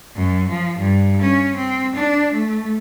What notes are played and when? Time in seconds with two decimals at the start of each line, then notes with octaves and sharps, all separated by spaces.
0.15 F#2
0.49 F3
0.79 G2
1.21 C#4
1.56 C4
1.95 D4
2.33 A3